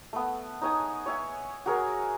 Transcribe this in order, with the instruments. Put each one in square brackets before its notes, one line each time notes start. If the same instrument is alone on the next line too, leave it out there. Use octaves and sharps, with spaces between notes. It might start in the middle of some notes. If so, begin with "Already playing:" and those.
[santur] A3 B3
D#4 C#5 G#5 D#6
C#5 E5 G#5
F#4 G#4 A#4 G#5